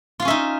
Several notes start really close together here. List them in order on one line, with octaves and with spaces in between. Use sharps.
F4 F5 C#4 E5 D#4